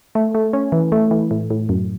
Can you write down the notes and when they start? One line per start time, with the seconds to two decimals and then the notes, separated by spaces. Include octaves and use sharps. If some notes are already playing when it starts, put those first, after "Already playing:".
0.15 A3
0.35 A3
0.53 C#4
0.72 E3
0.92 A3
1.11 E3
1.31 A2
1.50 A2
1.69 F#2